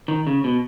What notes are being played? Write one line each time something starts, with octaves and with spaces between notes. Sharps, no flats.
D#3
C#3
B2